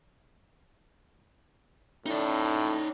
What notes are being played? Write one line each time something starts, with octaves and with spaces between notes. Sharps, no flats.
A2 D#4 D5